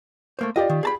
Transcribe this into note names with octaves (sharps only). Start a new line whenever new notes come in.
A3 A#3 C5
F4 G4 D5 D#5
D#3
G#4 A5 B5